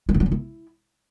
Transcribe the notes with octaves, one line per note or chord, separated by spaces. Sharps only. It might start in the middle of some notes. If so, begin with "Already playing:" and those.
F3
D#3
F#3
C#3
E4